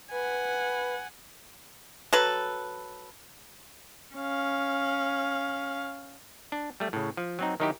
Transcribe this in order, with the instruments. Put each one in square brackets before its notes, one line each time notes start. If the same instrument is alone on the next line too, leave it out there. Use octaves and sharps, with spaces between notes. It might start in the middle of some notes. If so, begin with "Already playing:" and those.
[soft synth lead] B4 [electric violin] F#5 G#5
[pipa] F#3 A4 B4
[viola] C#4 F5
[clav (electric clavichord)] D4
G3 A3
A2 C#3
F3
F#3 C4 D#4
D#3 F#3 D#4 E4 G4